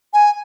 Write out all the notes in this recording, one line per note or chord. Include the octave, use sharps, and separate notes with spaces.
G#5